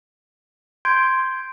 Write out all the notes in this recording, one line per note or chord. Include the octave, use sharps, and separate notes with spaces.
C6 G6 G#6 D7